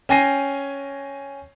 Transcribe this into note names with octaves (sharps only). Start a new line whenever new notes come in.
C#4 G5 G#5 A#6 C7 D#7